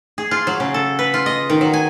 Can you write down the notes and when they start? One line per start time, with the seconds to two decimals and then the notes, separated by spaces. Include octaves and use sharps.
0.18 G#4
0.31 F4
0.47 F#3
0.60 C#3
0.74 A4
0.99 B4
1.14 F4
1.26 D#5
1.50 D#3
1.61 F#3
1.73 G#5